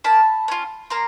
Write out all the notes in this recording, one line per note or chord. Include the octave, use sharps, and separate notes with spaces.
A#3 A5 B5
C#4 F4
A#3 A#5 C6